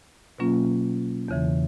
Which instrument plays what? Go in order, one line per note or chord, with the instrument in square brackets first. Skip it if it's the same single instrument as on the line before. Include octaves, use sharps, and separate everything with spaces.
[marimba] B2 F#3 A#3 C#4 F4
E2 C#3 E3